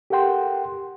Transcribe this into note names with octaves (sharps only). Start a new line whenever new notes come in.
G4 A4 A#4 F#5 G5 C6